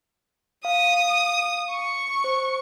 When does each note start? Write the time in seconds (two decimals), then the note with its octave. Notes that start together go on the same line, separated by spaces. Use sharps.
0.65 F5 D#6
1.71 C#6
2.24 C5